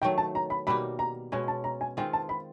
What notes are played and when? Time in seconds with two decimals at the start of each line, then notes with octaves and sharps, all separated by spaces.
0.02 D#3 F#3 A3 G5
0.18 A5
0.35 A#5
0.50 B5
0.67 B2 G3 A#3 D#4 B5
0.99 A#5
1.32 B2 G#3 C#4 G#5
1.48 A5
1.64 A#5
1.81 G#5
1.97 D#3 G#3 C4 F4 G5
2.13 A5
2.29 B5